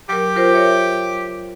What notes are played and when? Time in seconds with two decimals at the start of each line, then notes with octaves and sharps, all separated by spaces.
0.09 F#3 G4 A#4
0.36 F4 A#4 C5
0.53 A#4 C#5 E5